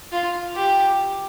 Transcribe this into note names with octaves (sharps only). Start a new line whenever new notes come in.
F4
G4